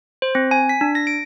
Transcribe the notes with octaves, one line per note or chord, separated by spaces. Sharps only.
C5
C4
G#5
B6
D4
A#6
D7